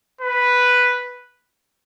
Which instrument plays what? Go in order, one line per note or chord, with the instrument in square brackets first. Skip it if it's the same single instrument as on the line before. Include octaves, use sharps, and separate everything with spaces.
[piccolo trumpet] B4